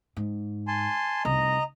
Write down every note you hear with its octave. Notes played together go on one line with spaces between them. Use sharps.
G#2
G#5 A5 C6
F1 C2 D#5 A#5